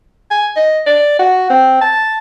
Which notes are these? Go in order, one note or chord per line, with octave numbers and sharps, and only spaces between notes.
G#5
D#5
D5
F#4
C4
A5